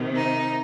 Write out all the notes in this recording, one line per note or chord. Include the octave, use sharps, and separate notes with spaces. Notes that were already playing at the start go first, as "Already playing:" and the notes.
Already playing: C3 D#3
D#4